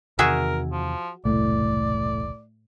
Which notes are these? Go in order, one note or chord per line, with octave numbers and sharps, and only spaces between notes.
E2 C3 D#3 F#4 G#4 A#4 E5
F3
E1 C2 A2 D5